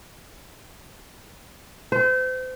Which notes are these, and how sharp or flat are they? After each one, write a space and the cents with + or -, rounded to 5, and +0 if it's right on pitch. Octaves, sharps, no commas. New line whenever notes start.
C5 -35